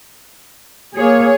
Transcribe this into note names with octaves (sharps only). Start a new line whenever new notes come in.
A#3 G#4 C#5